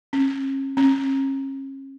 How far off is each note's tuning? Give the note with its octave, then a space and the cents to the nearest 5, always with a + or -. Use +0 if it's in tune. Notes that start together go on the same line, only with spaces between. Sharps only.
C#4 -35
C#4 -40